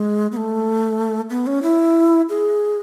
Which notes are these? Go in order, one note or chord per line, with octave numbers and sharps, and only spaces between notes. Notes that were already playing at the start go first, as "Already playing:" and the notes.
Already playing: G#3
B3
A3
B3
C#4
E4
G#4